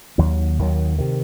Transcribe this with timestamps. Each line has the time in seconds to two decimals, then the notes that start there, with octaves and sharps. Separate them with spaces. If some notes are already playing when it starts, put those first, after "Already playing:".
0.18 D#2 D#3 F#3
0.59 D#2 D#3 F#3
0.98 C3 D#3